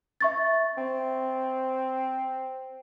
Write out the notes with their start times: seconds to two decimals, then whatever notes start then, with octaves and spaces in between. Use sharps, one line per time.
0.21 E5 C#6 A6
0.77 C4